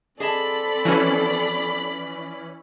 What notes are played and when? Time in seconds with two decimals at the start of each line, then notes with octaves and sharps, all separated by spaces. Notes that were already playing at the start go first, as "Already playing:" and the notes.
0.20 C4 G#4 A4 D5 D#5 A5 B5
0.85 E3 F3 C#4 F#4